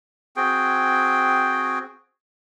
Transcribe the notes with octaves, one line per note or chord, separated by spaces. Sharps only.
C4 F#4 G#4 G5